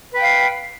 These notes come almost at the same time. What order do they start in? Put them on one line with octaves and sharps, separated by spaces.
B4 G5 F5